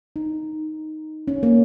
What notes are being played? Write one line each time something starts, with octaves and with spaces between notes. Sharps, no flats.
D#4
C#4
A#3